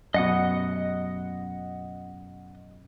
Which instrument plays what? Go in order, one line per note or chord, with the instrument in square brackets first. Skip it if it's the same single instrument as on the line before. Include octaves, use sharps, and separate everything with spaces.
[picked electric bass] F#2 B2 [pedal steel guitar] D#5 F#5 D#6